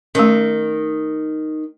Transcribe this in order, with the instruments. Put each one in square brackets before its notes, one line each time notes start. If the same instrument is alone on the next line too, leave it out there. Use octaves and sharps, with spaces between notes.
[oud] D#3 [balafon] A3 C#4